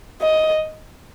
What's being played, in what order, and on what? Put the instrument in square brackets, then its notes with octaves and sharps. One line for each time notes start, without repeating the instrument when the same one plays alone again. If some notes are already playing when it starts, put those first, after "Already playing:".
[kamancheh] D#5